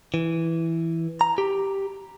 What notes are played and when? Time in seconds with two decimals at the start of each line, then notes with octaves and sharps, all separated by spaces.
0.14 E3
1.21 A#5
1.38 G4